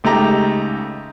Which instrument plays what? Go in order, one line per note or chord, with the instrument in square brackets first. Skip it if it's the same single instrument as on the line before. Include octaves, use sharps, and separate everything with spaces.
[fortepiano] C#2 A3 D#4 G4 A#5